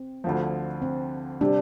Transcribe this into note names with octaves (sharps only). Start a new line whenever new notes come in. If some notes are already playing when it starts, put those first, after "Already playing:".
Already playing: C4
D2 D3 F3
C4
C3 G3 D4